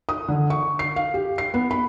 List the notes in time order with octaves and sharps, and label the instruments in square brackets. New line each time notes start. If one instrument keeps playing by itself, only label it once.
[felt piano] D#6
D3
C#6
C7
F5
G4
C7
B3
B5